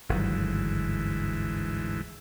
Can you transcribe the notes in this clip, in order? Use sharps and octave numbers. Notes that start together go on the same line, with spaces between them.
G1 D2 G#2 D#3 E3 F#3